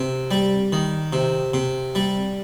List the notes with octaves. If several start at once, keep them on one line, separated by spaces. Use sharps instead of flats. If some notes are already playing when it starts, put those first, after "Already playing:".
Already playing: C3
G3
D#3
C3
C3
G3